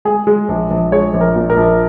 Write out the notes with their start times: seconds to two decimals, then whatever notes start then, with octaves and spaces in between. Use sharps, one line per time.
0.05 G#3 G#4
0.27 G#3
0.49 A#1
0.71 A#1
0.92 G#3 C#5
1.14 A#1
1.21 A#4
1.35 A#2
1.50 A#4
1.57 A#1